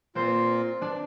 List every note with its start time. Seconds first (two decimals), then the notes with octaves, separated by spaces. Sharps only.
0.15 A#2 A#3 C4 F4 C5
0.81 D4 D5